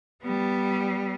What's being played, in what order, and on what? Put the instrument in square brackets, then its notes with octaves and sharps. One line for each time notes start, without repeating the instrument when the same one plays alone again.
[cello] G3 B3